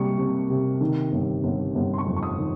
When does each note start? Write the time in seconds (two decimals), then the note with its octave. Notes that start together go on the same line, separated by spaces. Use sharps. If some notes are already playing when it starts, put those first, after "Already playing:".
Already playing: C3 G3 A#3 C#6
0.18 C3
0.50 C3
0.81 D#3
1.12 G1
1.43 G1
1.75 G1
1.93 C6
1.98 C#6
2.06 F2
2.16 C#6
2.23 D#6
2.38 D#3